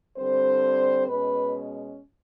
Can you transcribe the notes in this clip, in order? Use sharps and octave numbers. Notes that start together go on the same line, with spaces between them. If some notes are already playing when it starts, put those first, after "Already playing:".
D3 G3 C4 C5
B2 G#3 C#4 B4